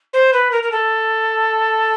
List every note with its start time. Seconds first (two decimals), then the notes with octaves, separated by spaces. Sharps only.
0.13 C5
0.33 B4
0.52 A#4
0.63 A#4
0.72 A4